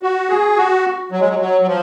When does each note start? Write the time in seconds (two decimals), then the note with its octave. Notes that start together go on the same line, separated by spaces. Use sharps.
0.03 F#4
0.29 G#4
0.56 F#4
1.12 F#3
1.20 G#3
1.29 F#3
1.39 F#3
1.61 F#3
1.67 F3